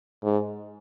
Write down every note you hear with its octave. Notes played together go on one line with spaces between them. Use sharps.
G#2